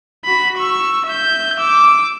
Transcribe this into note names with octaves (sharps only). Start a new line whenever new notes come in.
F#4 B5
C#6 E6
E5 G6
D6 E6